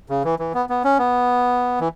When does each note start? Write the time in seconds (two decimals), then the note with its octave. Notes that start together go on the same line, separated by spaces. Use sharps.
0.09 C#3
0.24 E3
0.39 E3
0.54 B3
0.69 B3
0.84 C#4
0.99 B3
1.80 E3